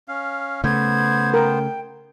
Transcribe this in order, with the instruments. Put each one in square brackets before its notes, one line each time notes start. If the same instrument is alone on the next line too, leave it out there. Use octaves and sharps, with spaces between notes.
[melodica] C#4 F5
[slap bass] C#3 A3 [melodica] B3 C5 [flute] G#6
[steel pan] A#4 [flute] G5